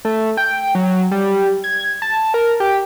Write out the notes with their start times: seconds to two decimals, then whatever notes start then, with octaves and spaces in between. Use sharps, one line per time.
0.05 A3
0.37 G5
0.75 F#3
1.11 G3
1.64 G#6
2.02 A5
2.34 A#4
2.60 G4